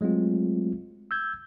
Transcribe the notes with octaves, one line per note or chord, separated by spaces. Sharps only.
F#3 G#3 A3 C4 F4
E6 G6 G#6